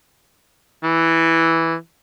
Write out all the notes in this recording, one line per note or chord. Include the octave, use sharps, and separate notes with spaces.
E3